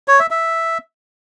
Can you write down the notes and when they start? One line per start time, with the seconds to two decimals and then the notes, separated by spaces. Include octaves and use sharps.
0.08 C#5
0.19 E5
0.31 E5